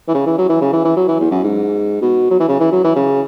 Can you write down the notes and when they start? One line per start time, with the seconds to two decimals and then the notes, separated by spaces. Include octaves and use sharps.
0.08 E3
0.15 C#3
0.26 E3
0.38 F#3
0.49 E3
0.61 C#3
0.73 E3
0.85 E3
0.96 F#3
1.08 E3
1.20 E2
1.31 F#2
1.44 G#2
2.02 B2
2.31 F#3
2.40 E3
2.49 C#3
2.61 E3
2.72 F#3
2.84 E3
2.96 C#3